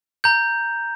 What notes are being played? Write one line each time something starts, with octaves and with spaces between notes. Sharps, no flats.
A#5 G6